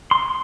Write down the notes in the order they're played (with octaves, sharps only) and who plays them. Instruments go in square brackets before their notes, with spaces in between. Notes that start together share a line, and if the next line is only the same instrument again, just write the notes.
[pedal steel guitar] C6